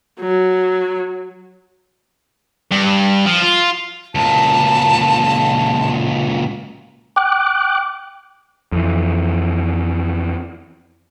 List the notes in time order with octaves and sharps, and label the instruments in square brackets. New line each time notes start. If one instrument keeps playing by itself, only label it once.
[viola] F#3
[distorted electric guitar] G2
F3
F4
[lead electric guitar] C#2 A#2 [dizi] A5
[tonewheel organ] G5 D6 F#6
[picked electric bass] F2 E3